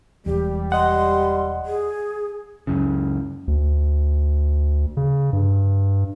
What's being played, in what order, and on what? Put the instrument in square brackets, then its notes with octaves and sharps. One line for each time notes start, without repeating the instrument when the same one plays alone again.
[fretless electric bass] E1 E2 [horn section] G3 [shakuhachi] G4
[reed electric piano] D#5 F#5 [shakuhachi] C6
[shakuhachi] G#4
[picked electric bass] C#2 F#2 C#3
[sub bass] D2
C#3
G2